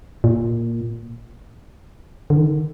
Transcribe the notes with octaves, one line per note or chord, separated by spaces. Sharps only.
A#2
D3
D#3